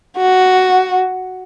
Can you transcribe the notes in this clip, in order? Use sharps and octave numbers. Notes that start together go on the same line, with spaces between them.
F#4